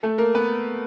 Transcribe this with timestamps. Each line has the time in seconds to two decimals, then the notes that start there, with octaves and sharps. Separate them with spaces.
0.03 A3 A4
0.18 A#3 A#4
0.35 B3 B4